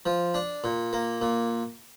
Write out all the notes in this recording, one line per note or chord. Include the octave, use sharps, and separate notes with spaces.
F3
D4
A#2
A#3
A#2